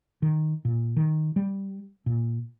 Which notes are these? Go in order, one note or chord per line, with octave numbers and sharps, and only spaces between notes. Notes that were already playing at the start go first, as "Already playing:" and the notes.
D#3
A#2
D#3
G3
A#2